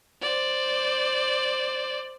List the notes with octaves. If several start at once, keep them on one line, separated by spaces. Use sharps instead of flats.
C5 D5